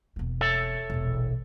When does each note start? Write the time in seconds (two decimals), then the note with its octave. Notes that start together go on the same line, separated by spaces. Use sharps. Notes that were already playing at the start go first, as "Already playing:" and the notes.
0.16 E1 A#3
0.41 A4 C#5 E5
0.90 E1 A#1